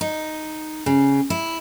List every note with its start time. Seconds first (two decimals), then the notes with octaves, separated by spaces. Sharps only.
0.01 D#4
0.86 C#3
1.30 E4